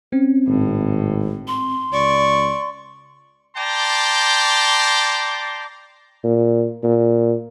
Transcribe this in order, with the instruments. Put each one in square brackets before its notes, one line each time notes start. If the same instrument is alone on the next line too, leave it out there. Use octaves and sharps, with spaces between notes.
[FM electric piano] C4 [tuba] C#4
[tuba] G#1 [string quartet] A2
[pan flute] C6
[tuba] C#2 [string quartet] D5 C#6
[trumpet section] D5 G5 A5 A#5 C6 D6
[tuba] A#2
A#2